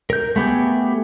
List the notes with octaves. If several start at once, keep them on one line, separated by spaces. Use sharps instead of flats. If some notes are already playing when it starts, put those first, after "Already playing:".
A#4 G6
A3 B3 G4 G#4